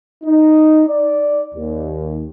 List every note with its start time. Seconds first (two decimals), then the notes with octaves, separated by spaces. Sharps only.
0.23 D#4
0.88 D5
1.53 D#2